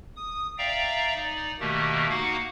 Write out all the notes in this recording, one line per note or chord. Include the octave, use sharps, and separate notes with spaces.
D#6
D5 E5 F5 G5 A#5
D#4 D5
B2 D#3 A3 A#3 G4
A#3 D#4 F#4 F5 F#5